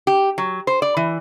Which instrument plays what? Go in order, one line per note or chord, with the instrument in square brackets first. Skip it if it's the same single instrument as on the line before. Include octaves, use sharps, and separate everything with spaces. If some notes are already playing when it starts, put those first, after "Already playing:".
[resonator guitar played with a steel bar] G4
F#3
C5
D5
E3